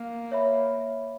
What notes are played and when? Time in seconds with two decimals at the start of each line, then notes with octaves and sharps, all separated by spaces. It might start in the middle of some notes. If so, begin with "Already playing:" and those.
Already playing: A#3
0.31 C#5 E5 B5